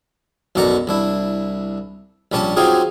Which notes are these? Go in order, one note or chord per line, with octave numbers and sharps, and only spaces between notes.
B1 F#2 B2 D5 F#5 A#5
C2 D4 E4
A#1 G3 C#4 D5 A5
F#3 C4 D#4 F4 G4 G#4